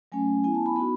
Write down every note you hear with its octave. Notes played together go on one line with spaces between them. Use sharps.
F#3 A3 C#4 G#5
B3 E4 G#5
A5
B5
B3 D#4 F#4 B5